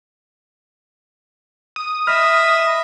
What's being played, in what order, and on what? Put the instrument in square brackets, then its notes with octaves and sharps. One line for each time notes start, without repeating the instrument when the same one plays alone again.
[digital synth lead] D#6
[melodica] D#5 B5 [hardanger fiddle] E5 [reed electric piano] F6